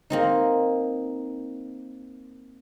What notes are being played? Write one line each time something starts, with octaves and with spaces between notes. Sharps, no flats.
A#3 C4 D#4